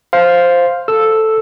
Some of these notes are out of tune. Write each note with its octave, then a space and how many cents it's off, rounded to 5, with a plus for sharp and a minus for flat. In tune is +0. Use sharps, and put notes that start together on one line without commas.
C5 +0 F5 +0
A4 +0 E6 +0